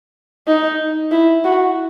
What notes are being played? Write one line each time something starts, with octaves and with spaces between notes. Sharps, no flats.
D#4
E4
F#4